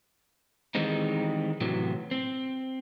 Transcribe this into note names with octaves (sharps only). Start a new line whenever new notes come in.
D#3 E3 G3 G#3 C4 D#4
A2 C3 E3 F#3
C4